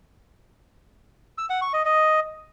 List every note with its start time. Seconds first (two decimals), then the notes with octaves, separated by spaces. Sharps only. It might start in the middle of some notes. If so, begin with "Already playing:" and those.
1.38 E6
1.50 F#5
1.62 C#6
1.73 D#5
1.85 D#5